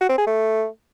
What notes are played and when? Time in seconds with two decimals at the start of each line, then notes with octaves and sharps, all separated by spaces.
0.01 F#4
0.09 C4
0.18 G#4
0.26 A3